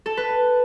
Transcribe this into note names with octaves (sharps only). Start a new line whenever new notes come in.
A4
B4